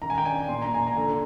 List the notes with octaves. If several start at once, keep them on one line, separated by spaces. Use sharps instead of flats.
D#3 A#5
G#5
G5
D4 G#5
A#2 C6
A#5
A#2 G#5
A#5
D3